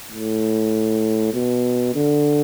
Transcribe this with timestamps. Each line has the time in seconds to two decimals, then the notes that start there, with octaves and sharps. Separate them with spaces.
0.12 A2
1.34 B2
1.95 D3